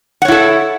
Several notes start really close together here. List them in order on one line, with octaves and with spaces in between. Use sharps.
F#5 C#5 E4 A4